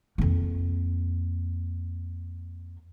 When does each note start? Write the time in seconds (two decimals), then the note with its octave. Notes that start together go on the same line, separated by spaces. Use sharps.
0.18 F2 A#3